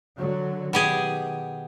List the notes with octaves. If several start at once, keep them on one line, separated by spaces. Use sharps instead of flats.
D3 F#3
B2 D#3 G4 G#4